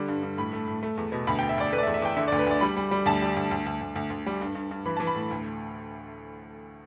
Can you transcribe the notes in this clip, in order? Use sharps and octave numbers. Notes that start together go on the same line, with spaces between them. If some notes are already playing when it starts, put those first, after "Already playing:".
Already playing: D3 G3
G2
G2
A2 B5
A3
A2
A3
E2
B2
D2 B5
G5
D2
E5
D2 D5
A3 B4
D5
E5
E2
E5
E2 G5
D3 E5
D5
D2
B4
D2 D5
G3 B5
G3
G3
D2 A5
G3
D2
D2
D2
D2
D2
D2
G3
G2
G2
G2
E3 B5
E3 A5
B5
A2
D2